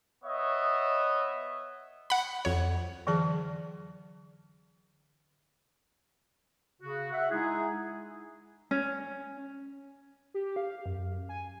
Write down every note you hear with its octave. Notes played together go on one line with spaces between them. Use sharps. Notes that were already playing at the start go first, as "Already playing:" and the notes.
B3 C#5 D#5 E5
F#5 B5
F2 C#5
D3 E3 F#3 G#4 A5
C#3 F#4
E5 F#5
G#3 D#4 E4 G#4
C#4
G4
F5
F#2
G#5